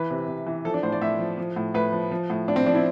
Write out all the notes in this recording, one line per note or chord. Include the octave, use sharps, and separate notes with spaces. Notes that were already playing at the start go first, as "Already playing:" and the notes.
Already playing: E3 B4
C3
C3
E3
F3 A4
D4
A2 C5
D5
A2 E5
F3
F3
A2
A2 B4
F3
F3
A2
A2 D4
C4
F3 D4
E4